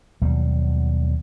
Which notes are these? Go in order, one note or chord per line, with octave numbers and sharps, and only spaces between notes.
D#2 B2 F#3 G3